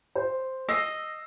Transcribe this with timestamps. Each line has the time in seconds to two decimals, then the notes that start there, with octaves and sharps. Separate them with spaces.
0.15 C5
0.69 D#5 E6 A#6 C7